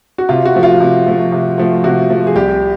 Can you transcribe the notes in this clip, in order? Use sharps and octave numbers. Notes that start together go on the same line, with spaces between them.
F#4
C3 F4
F#4
F3 A3
F4
C3
F3 A3
C3
F3 A3
C3 F#4
F3 A3
G#4
C2 G4